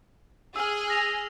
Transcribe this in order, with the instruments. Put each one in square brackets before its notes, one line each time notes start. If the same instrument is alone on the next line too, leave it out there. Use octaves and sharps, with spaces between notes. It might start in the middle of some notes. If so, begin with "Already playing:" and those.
[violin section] G#4 [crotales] E6 F6
[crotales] F6 A#6 F7